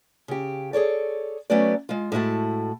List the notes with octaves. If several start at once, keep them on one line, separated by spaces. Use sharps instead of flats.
C#3 G4
G#4 A4 C#5 D5
F#3 A3 B3 C#4 F#4 D5
G#3 F4
A2 G#3 E4 F#4 A5